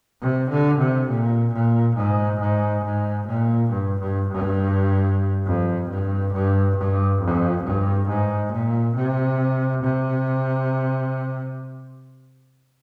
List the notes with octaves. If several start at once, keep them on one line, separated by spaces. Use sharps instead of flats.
C3
D3
C3
A#2
A#2
G#2
G#2
G#2
A#2
G2
G2
G2
F2
G2
G2
G2
F2
G2
G#2
A#2
C3
C3